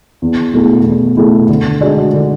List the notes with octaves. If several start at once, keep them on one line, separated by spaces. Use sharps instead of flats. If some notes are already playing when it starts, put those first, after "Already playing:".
E2
B2 A3 E4 G#4
E2
B2 A3 E4 G#4
D3
G#3 D4 F#4
D3